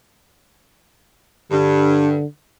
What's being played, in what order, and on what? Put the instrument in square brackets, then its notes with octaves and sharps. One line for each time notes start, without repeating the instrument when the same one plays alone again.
[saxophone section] G2 [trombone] D3